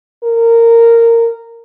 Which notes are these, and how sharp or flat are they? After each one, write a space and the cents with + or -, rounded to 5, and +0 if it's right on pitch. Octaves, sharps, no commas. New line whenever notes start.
A#4 -15